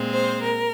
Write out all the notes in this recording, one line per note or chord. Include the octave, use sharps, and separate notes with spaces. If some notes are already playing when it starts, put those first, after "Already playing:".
Already playing: A#2 G#3 C4
C5
A#4